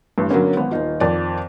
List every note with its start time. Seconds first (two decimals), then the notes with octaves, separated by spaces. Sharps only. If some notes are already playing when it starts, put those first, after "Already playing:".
0.18 A1 G2
0.30 D3 F#3 A#3 B3 C#4
0.57 G#1 B3
0.71 D#1 D#4 F4
1.00 F2 D#3 D5